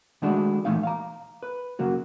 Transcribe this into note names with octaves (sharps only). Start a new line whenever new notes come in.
D#3 G#3 A3 D4 E4 F#4
A#2 E3 A3 D#4 F5
F5 A#5
B4
C#3 F#3 A#3 F#4